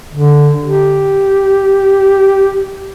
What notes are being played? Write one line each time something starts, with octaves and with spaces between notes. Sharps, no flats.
D3
G4